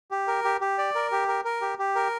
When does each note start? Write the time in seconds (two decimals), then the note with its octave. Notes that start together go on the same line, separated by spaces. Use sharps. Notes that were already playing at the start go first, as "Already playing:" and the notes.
0.11 G4
0.28 A#4
0.44 G4
0.61 G4
0.78 D5
0.95 A#4
1.12 G4
1.28 A#4
1.45 A#4
1.61 G4
1.79 G4
1.95 A#4